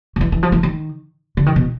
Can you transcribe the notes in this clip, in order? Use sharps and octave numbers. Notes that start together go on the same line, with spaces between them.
D#3
E3
E3
F3
E3
D#3
D3
D#3
B2